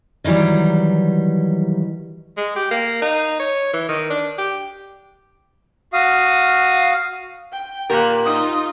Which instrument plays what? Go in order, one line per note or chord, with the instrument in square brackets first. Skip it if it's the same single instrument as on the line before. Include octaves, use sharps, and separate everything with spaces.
[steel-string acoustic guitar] D#3 E3 F#3 G3
[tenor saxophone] G#3
G4
A#3
D#4
C#5
E3
D#3
D4
G4
[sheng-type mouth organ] F#4 F5 D#6
[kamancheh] G5
[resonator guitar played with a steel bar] A#2 G4 A#4 [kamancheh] A#3 F#6
[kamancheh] D#4 F4 [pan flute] D#6